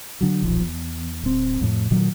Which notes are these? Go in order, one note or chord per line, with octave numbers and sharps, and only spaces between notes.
D3 F#3
D#1 B1 D#3 F3
E2
D1 C4
F2 A2
A#2 D#3 F#3 A3